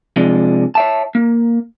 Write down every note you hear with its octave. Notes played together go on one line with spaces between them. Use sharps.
C3 F3 G#3 D4
C#5 E5 A5
A#3